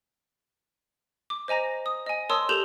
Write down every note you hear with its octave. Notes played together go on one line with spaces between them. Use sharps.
D6
C5 D#5 G#5 A#5 A#6
D#6
D#5 G#5
A#4 C#5 A5 C6 D#6 E6
G4 A4 A#4 G6 E7 F7